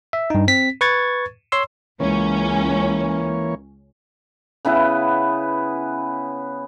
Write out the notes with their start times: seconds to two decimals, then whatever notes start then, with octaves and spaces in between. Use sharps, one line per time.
0.13 E5
0.30 G2 D#4
0.48 C4 B6
0.81 B4 C#6 G#6 A6
1.52 C#5 C6 E6
2.00 C#2 E3 A#3 C#4 C#5
4.65 C#3 B3 E4 B4